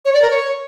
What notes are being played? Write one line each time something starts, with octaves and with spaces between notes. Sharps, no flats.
C#5
D5
A#4
C#5